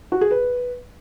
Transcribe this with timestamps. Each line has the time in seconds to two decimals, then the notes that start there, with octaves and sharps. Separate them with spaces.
0.12 F#4
0.21 G#4
0.31 B4